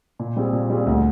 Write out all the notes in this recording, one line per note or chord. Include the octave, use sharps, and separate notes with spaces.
A#2
G3 C4 F4 G#4
A#2
G3 C4 F4 G#4
D2